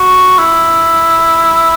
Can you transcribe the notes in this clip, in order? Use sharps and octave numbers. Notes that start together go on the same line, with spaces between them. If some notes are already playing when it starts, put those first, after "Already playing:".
Already playing: F#4
E4